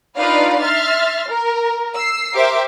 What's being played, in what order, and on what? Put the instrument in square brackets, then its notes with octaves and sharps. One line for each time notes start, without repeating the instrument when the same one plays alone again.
[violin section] D4 D#4 F4 B4 D5 F5
E5 C6 F6 A6
A#4
E6 C7
G4 A#4 C5 E5 D6